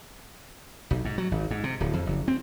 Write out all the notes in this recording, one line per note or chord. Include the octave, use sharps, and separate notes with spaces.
B1
G#2
F#3
G#1
G#2
C3
D1
F2
F#1
C4